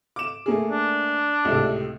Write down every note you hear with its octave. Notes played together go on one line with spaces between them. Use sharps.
D6 E7
A3 A#3 G#4
D4
C#2 A2 C3